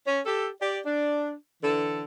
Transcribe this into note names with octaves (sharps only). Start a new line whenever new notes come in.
C#4
G4 A4
G4 D5
D4
D3 E3 A4